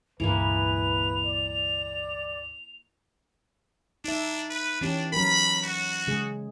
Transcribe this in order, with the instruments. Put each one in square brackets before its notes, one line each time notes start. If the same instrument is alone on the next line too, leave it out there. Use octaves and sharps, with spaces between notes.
[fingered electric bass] C#2 G2 A#2 [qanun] E3 G#3 A#3 [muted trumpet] B4 [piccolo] F7
[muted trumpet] D5
[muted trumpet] D4 [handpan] D#4 E5
[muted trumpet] B4
[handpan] E3 C#4 G4 [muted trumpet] D4
[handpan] F#3 C#4 A#4 [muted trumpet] B5
[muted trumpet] F#4
[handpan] C#3 G#3 G#4